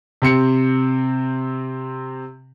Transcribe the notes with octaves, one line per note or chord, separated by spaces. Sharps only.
C3 C4 C#7